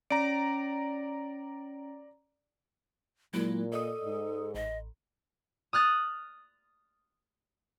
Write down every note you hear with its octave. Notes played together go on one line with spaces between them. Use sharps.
C#4 D5 A#5 D7
A#2 F#3 G#3 A#3 E4
A4 D5 D#5 D#6
G#2
A1 D#5
D#6 F6 F#6 A6